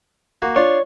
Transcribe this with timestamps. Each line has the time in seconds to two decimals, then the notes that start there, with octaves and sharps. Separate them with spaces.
0.42 A#3 F#4
0.56 D4 F4 C#5 C6